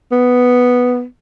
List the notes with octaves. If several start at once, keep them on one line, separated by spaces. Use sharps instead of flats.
B3